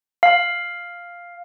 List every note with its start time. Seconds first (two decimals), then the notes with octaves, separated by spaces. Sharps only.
0.23 F5